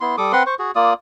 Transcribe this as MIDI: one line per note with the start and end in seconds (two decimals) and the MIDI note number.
0.01 0.16 59
0.01 0.16 64
0.01 0.16 84
0.18 0.32 55
0.18 0.32 69
0.18 0.32 86
0.18 0.32 87
0.32 0.43 60
0.32 0.43 71
0.32 0.43 78
0.32 0.43 84
0.46 0.55 72
0.46 0.55 85
0.59 0.71 66
0.59 0.71 68
0.75 0.93 58
0.75 0.93 65
0.75 0.93 74
0.75 0.93 87